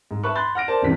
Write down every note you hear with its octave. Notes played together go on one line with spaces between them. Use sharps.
G#2
B4 E5 A5 B5 C#6 F#6
B5 C6 F#6 G6 A6
F#5 F6 A#6 D7
A#4 C5 D5 A5
C#2 G2 C3 E3 B6